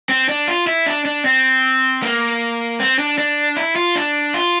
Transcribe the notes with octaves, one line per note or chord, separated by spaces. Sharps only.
C4
D4
F4
E4
D4
D4
C4
A#3
C4
D4
D4
E4
F4
D4
F4